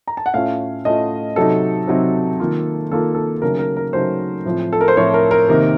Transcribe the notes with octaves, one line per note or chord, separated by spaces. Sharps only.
A#5
A5
F#5
A2 A3 C#4 F4 F5
A2 A3 C#4 F4 D#5
C3 F#3 C4 D#4 A4
C3 F#3 C4 D#4
D#3 A#3 F4
D#3 A#3 F4 A4
A4
C#3 F#3 A3 D#4 A#4
A#4
A#4
C#3 F#3 A3 D#4 C5
A2 F3 C4 F4
A4
A#4
C5
A2 F3 C4 F4 C#5
A#4
A#4
C3 D#3 A#3 D#4